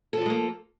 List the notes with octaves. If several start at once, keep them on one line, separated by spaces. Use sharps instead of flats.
F3 G3 G#3 A#3 A4